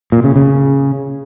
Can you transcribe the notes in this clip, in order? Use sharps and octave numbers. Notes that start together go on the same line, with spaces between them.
A#2
C#3
C#3